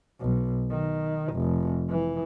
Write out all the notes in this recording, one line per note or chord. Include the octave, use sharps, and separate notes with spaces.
B1
D#3
F1
E3